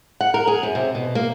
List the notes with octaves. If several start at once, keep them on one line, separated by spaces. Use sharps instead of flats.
F#5
A#4
G#4
F#2
C3
B2
A#3